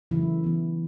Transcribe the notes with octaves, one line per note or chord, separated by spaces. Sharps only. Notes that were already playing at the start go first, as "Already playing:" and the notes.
C#3 E3 F#3 A3 E4
E3 B3